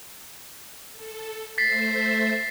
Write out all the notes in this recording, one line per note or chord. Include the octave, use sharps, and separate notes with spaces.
A4
A3 C5 E5 A6 B6 C7